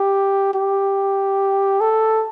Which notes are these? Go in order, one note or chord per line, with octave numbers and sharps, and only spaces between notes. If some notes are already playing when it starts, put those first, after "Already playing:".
Already playing: G4
G4
A4